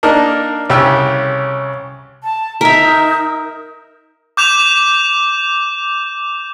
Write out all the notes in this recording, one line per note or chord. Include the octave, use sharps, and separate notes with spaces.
A#3 D4 D#4 A#4
C2 C#3 C#4 G4 E6
A5
D#4 A#4 E5
D6 G6 E7 F7